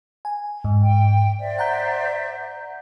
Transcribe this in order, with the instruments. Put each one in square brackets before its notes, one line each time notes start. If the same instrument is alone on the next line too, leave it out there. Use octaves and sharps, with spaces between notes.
[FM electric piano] G#5
G#2
[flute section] G5
C5 D5 E5
[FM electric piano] F#5 A#5 G6